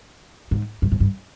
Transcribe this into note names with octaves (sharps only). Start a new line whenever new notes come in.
G#2
G2
G#2
G2